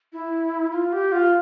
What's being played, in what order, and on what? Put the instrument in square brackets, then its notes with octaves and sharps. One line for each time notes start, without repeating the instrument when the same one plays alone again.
[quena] E4
F4
G4
F4